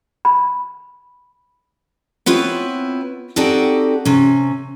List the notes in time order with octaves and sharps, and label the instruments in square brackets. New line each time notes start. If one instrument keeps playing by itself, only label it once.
[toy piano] B5
[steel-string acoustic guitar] B3 C4 E4 F4 B4 C#5
C4 D#4 F#4 G4 A4 D5
C3 C#4